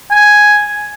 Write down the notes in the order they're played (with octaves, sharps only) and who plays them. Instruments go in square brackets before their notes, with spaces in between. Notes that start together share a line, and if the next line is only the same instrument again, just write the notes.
[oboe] G#5